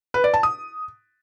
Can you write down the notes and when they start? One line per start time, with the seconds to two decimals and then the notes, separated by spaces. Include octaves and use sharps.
0.14 B4
0.24 D5
0.34 A5
0.43 D#6